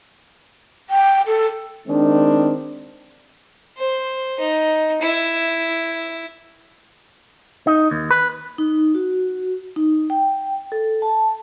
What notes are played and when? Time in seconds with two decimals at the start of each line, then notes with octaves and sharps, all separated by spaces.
0.90 G5
1.26 A4
1.87 D#3 G#3 C4 D4
3.78 C5
4.40 D#4
5.02 E4
7.67 D#4
7.91 D#2
8.11 B4
8.58 D#4
8.95 F#4
9.76 D#4
10.10 G5
10.72 A4
11.02 A5